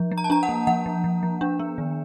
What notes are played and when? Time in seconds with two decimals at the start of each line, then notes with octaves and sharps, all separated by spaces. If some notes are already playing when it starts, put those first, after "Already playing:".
Already playing: F3
0.12 F3
0.18 A#5
0.24 A5
0.30 D4 A#5
0.43 F#5
0.49 A#3
0.67 F3 F#5
0.86 F3
1.04 F3
1.23 F3
1.41 D4
1.60 B3
1.78 D#3